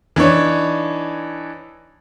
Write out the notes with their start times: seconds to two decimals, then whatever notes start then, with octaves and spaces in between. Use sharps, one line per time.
0.16 E3 D4 D#4 C#5